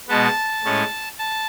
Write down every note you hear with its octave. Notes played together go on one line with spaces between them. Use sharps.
B2 G#3 B3 A5
A2 G#3 C#4
A5